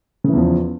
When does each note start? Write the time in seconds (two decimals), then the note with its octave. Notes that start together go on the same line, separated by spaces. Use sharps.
0.24 C#3
0.29 E3
0.33 E2
0.38 F3